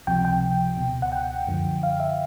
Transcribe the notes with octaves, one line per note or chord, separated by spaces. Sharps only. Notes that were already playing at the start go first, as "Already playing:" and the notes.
C#2 C3 F3 G5
G5
C#2 B2
F#5
G5
F#2 D3 F3
F5
E5